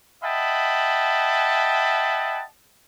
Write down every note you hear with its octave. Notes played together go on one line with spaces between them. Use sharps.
D#5 E5 F#5 G5 A5 B5